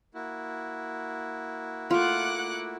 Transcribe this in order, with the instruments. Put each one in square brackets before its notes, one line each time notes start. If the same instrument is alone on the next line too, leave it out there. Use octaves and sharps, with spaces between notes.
[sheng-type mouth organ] A#3 E4 F#4
[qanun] A3 F4 [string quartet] F#5 D6 F#6